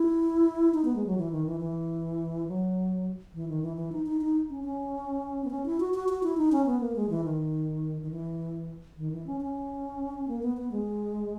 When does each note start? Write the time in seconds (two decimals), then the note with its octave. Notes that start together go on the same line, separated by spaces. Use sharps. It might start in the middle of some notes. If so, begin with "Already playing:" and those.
Already playing: E4
0.74 D#4
0.85 B3
0.96 G#3
1.06 F#3
1.17 E3
1.32 D#3
1.46 E3
1.60 E3
2.48 F#3
3.34 E3
3.48 D#3
3.62 E3
3.77 E3
3.92 D#4
4.06 D#4
4.21 D#4
4.50 C#4
4.64 C#4
5.45 B3
5.51 C#4
5.66 E4
5.80 F#4
5.94 F#4
6.09 F#4
6.23 E4
6.37 D#4
6.52 C#4
6.66 B3
6.81 A#3
6.96 G#3
7.10 E3
7.25 D#3
8.02 D#3
8.11 E3
8.97 D#3
9.12 E3
9.27 C#4
9.41 C#4
10.28 A#3
10.43 B3
10.57 B3
10.72 G#3